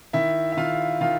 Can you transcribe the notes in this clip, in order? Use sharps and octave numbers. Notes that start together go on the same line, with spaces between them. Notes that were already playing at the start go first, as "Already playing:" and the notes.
D#3 E4 E5
E5
D#3 F4 F5
D#3 F4 F5